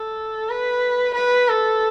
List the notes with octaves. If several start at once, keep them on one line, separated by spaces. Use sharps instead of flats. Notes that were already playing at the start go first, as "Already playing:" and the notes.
Already playing: A4
B4
B4
A4